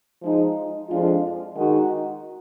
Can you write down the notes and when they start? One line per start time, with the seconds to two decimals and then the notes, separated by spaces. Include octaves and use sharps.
0.23 F3 G#3 D#4
0.89 F2 F3 G#3 D4 F4
1.56 D#3 G#3 D#4 F#4